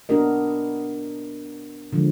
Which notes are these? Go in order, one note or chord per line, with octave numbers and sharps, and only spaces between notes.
B3 D4 F#4 A#4 D#5
D3 F3 G#3